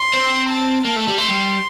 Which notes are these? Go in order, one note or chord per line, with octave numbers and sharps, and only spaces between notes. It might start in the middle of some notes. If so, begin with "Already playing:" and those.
Already playing: C6
C4
A5
A#3 A5
A3
G3
A3 C6
G3